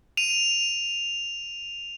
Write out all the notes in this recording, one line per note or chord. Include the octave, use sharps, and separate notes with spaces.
D#7 F7